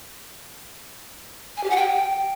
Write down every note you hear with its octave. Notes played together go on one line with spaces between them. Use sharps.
G#5
G4
F#5
G5